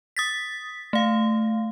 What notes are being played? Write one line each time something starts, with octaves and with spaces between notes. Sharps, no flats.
D#6 A6 B6
A3 F5